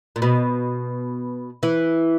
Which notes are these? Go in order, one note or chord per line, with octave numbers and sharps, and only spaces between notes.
A#2
B2
E3